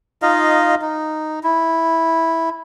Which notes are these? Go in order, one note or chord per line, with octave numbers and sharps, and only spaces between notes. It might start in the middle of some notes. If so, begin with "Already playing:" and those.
D#4 F4 D#5 F5
D#4
E4